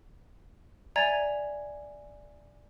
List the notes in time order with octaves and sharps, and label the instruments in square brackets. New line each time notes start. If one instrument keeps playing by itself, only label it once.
[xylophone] D5 E5 G#5 A#5 G#6 A6